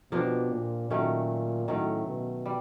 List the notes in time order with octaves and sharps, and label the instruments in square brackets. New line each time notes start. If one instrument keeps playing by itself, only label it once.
[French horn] B2 [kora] F3 A#3 D4 G4
[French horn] A#2
[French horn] A#2 [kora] D#3 F#3 A3 C#4
[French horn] A2 [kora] D#3 F#3 A3 C#4
[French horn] B2
[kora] G3